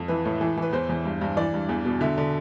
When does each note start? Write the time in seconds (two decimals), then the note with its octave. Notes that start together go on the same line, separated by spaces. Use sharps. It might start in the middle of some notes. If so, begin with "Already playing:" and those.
Already playing: F2
0.08 E3 B4
0.25 A2
0.41 E3
0.57 E3 B4
0.72 E2 C5
0.89 E2
1.05 G2
1.21 G2
1.37 E3 D5
1.54 G2
1.69 E2
1.85 B2
2.01 D3 E5
2.18 D3